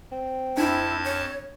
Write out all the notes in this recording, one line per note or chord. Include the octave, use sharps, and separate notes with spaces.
C4
F2 D4 E4 A5 G#6
C#5